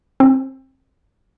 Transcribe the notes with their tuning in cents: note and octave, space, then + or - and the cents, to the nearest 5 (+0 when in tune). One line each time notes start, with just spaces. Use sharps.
C4 +25